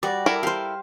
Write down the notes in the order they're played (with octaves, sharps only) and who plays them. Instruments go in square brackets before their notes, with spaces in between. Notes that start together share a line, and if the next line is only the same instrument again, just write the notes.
[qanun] G3 [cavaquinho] F#4 D5
[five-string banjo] E4 A4 A#4
[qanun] G4 C5 [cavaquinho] F5